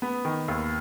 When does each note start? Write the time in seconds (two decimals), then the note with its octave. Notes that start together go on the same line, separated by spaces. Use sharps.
0.02 B3
0.25 D#3
0.48 D#2